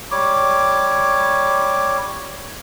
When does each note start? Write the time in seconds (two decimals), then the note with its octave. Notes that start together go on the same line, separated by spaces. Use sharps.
0.11 G3 C#5 D6